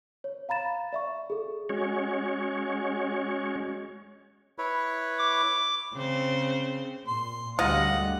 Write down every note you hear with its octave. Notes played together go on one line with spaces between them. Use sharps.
C#5
F5 A#5 B5 A6 E7
D5 E5 C#6
G#4 A4
G#3 C#4 F#4 C#5
E4 B4 C#5
D6
C#3 C4 C5
A#2 C6
D2 C#3 G3 F4 D#5 F#5